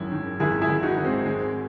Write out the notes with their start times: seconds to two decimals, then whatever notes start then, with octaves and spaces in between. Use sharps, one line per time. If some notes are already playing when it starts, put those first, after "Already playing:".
Already playing: G#1 F#2 E4 G#4
0.12 D#3
0.40 G#1 E4 G#4
0.61 E4 G#4
0.69 G#1
0.83 D#4 F#4
0.98 G#1
1.05 G#3 C4
1.26 G#1 G#3